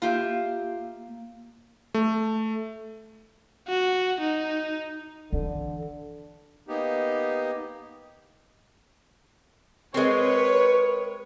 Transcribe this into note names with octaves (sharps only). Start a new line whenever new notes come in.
A#3 F4 G4 E5 F5
A3
F#4
D#4
D3 E3
A#3 B3 D#4 G4
G#3 C4 A#4 B4 C#5